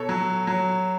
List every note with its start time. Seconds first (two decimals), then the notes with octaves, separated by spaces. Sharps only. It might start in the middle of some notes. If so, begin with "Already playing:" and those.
Already playing: B2 A4 C#5
0.09 F#3
0.47 F#3